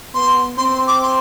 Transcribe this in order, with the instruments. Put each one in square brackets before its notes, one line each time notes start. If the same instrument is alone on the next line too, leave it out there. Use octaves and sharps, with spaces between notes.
[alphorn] B3 [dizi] C6
[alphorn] C4 [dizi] C6
[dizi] C6
D6
C6